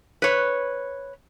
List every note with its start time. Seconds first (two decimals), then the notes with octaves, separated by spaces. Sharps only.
0.22 B4 C#5